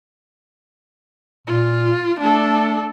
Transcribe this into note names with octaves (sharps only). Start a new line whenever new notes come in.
A#2 F4
A3 D4 A4